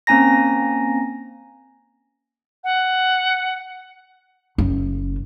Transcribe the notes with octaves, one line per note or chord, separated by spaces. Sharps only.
A#3 C4 C#4 G#5 A#5 A#6
F#5
F#1